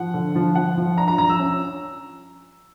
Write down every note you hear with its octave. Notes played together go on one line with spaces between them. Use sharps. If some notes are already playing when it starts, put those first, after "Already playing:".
Already playing: F3 F#5
D3
F3
F3 F#5
F3
D4 A#5
A#5
F3 A#5
E6
C#4